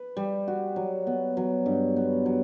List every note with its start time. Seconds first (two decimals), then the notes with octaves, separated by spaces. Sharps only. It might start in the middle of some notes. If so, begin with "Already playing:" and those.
Already playing: B4
0.17 G3
0.48 F#4
0.76 F#3
1.07 B3
1.37 F#3
1.66 G2
1.96 B3
2.26 F#3